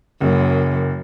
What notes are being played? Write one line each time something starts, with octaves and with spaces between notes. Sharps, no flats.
F#1 F#2